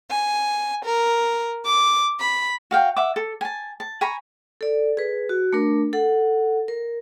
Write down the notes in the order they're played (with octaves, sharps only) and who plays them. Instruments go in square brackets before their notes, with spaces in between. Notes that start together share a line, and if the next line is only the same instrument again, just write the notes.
[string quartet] G#5
A#4
D6
B5
[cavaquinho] F#4 F5 G5
E5 F#5 D6
A4
G#5 A5
A5
G#5 A#5 B5 C#6
[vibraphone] A4 D5
G#4 B4
F#4
A3 D4 A#4
A4 F#5
A#4